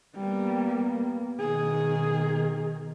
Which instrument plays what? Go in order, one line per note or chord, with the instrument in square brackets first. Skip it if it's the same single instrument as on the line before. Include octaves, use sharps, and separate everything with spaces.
[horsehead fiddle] G3 [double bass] A#3 B3
[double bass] B2 D#3 [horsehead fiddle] G#4